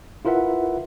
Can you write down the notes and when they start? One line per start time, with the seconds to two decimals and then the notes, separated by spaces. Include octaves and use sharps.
0.25 E4 F4 A#4 B4 E5 F#5